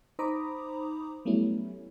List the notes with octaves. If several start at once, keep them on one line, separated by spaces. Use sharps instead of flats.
D#4 C5 A#5 B5 D6 D#6
F#3 G3 A3 B3 C#4 E4